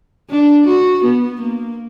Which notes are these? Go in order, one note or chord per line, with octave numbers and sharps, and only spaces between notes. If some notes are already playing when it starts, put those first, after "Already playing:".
D4
F#4
B3
A#3